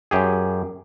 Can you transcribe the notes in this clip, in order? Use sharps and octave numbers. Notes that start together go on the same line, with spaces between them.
F#2 G4 G#4